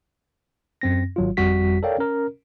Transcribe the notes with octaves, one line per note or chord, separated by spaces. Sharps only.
F#2 C4 A#6
G#1 F#3 F4
G1 F2 G3 F#4 B6
A4 A#4 C#5 D5 F5 G5
C#4 A#4